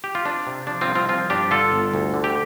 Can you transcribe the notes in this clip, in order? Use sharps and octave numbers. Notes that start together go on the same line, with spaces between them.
G4
F4
C4 D4
C3
F3 D4
C4 F4
C2
C4 F4
F3 C4 F4
G2 D4 G4
D3 F4 A4
G1
D2
D3
G4